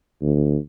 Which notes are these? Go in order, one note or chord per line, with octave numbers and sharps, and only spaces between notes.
D2